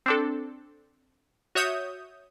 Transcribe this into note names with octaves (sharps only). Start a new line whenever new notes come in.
C4 D4 A4
F#4 C#5 E5 D#6 G6